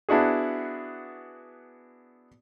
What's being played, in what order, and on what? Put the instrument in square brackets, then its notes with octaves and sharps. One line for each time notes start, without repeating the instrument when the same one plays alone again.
[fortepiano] B3 D4 E4 F#4 G#4